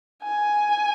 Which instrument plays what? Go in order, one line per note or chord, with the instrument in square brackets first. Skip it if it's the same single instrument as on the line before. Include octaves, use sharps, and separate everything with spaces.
[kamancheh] G#5